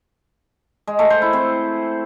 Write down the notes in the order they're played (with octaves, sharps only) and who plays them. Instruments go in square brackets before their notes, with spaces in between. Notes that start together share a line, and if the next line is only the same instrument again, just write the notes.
[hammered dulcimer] G#3
A3
C5
E4
C4